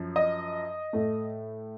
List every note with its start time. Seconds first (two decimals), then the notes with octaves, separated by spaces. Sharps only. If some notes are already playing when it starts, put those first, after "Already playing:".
Already playing: F#2 F3
0.16 D#5
0.93 A2 A3